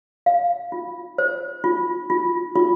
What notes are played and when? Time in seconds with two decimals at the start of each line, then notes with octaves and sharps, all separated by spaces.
0.26 F5
0.72 F4
1.18 C5
1.64 F4
2.10 F4
2.56 F4